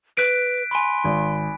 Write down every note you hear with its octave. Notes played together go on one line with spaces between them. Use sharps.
B4 F#6 B6 D7
G#5 B5 C6
G#1